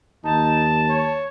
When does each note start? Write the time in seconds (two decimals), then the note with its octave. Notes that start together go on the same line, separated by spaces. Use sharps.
0.24 D#2 D#4 A5
0.89 C#5